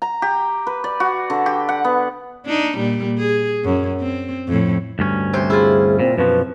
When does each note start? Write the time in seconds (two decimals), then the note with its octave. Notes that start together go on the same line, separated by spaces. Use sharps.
0.02 A#5
0.22 G4
0.67 B4
0.84 D5
1.00 F#4
1.30 D3
1.46 G4
1.69 F#5
1.84 B3
2.45 D4 D#4
2.78 A#2 G3
3.18 G#4
3.64 F#2
4.00 C4
4.48 F2 A2
4.99 D2 G2 C#4
5.33 C3 C5
5.50 E4 F4 G#4
6.00 A#2 C4
6.18 F#2 B2 F3 B4